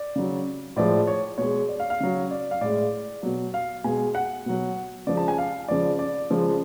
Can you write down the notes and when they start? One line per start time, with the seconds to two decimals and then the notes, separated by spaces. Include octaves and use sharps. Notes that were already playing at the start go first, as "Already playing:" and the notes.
Already playing: D5
0.16 C#3 F#3
0.76 A2 F3 G#3 D5
1.07 C#5
1.38 B2 G#3 C#5
1.69 D5
1.80 F5
1.90 F5
2.00 C#3 F#3
2.31 D5
2.51 F5
2.61 A2 G#3 D5
3.23 B2 F#3
3.54 F5
3.84 B2 G#3 G#5
4.15 F#5
4.46 B2 F#3
5.07 C#3 F3 G#3 D5
5.17 A5
5.28 G#5
5.38 F5
5.68 C#3 F3 G#3 D5
5.99 D5
6.30 C#3 F3 G#3